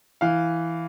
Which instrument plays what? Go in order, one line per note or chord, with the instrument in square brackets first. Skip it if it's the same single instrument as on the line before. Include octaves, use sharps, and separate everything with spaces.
[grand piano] E3 F5